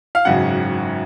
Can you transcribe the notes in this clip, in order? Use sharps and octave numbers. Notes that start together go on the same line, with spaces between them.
F5
G#1 F#2 C#3 F#5